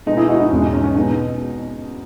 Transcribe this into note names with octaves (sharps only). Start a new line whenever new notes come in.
B2 G#3 B3 D#4
E4 G#4
D#4 F#4
D#4
E2 B2 G#3 C#4
D#4
C#4
C#4
B2 G#3 B3 D#4